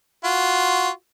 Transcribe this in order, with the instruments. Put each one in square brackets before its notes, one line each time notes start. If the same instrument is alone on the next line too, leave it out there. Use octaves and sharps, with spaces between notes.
[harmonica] F4 F#4